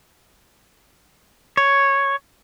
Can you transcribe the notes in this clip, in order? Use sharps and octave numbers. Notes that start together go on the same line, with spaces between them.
C#5